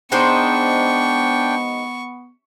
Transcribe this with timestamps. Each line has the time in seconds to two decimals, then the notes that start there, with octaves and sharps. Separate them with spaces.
0.12 G#3 B3 D4 D#4 C5 G5 C#6